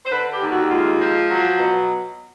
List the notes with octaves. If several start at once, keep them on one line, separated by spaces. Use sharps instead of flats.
C5
D3 B4
G4
D#2
F#4
G#3 F4
F3
F#3
B2